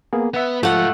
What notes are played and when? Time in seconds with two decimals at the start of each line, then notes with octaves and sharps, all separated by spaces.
0.13 A#3 B3 G#4
0.34 B3 E5 F#5
0.63 G#2 F3 A3 F4 F#5